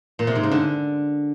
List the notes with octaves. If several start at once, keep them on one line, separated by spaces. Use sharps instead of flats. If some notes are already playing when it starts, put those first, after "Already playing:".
A#2
C3
G#2
C#3
D3